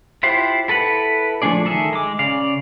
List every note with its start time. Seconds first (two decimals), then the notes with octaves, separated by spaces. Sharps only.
0.23 E4 F4 G4 C5 F#5
0.68 E4 A4 B4 F#5
1.42 F3 A3 D4 G#4 D5
1.65 D#3 G#4 A4 E5
1.93 G#3 D6
2.19 C#3 D5 F5